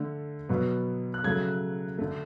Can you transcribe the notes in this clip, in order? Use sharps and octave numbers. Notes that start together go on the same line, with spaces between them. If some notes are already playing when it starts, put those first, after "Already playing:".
Already playing: D3 A3
B2 F#3 B3
F#6
C#3 F#3 A3 G#6
D3 A3